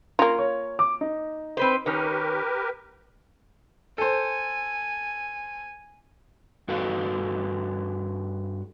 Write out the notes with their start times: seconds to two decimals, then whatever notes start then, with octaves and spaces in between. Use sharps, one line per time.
0.19 A#3 C#4 F4 A#5
0.39 C#5
0.79 D6
1.01 D#4
1.57 C4 B4 C5
1.86 D#3 C#4 G4 A#4 B4
3.98 A4 C5 G#5
6.68 G2 F#4 A4 B4 F5